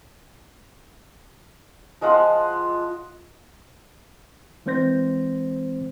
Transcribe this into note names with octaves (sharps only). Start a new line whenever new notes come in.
F3 G#3 F4 F#5
E3 G#3 C4 C5 G6 A#6